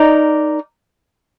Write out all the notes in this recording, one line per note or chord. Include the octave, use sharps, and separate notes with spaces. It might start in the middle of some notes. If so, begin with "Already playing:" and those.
Already playing: D#4 A#4 D5